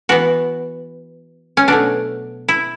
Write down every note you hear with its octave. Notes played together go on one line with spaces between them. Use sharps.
E3 B3 F#4
C#4
B2 F#3 A3 D4
E4